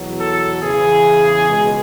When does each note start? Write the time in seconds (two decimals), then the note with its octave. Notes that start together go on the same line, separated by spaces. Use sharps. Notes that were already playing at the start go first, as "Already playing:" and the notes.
Already playing: E2 B2 F#3
0.20 A4
0.62 E2 C#3 E3 G#4
1.47 C#2 B2 G#3